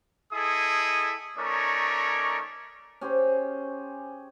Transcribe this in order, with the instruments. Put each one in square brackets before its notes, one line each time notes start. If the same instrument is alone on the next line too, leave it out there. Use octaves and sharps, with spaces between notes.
[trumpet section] E4 G#4 A4 D#5 D#6
A3 C#4 D#4 A#4 C#5 D5
[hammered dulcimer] C#4 G4 G#4 C5